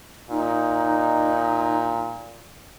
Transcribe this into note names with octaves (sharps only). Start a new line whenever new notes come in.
A#2 D#4